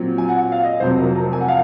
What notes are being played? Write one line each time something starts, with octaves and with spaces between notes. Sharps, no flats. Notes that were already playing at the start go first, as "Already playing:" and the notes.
Already playing: A#2 F#3 C4
G#5
F#5
F5
D#5
F1 F2 C3 F#3 C5
A#4
A#4
G#5
F#5
F5